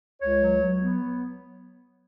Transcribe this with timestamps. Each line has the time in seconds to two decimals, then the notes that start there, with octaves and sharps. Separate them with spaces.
0.22 C#2 C#5
0.42 F#3
0.61 F#3
0.81 B3